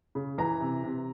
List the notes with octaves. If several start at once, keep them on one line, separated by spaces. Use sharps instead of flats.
C#3
E3 A#5
C3
C3